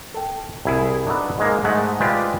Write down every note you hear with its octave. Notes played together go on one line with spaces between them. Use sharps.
A4 G5
C2 E4 G#4
D4 D#4 F#4 A4 B4
G#2 G#3 A#3
G#2 G#3 A3 F#5
G#3 F4 G4 B4 C5 D5